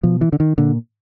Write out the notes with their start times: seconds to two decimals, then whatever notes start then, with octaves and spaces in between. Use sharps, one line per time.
0.03 B2 F3
0.21 E3
0.33 D3
0.40 D#3
0.58 A#2 D3